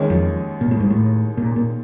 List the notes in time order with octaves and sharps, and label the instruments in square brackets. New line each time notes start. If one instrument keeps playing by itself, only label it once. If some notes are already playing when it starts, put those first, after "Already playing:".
Already playing: [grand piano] D#2 D#3 G#3 C#4
[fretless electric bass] F2
A#2
A2
G#2
A2
A#2
A#2